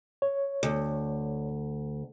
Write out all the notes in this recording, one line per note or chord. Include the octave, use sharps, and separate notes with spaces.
C#5
D2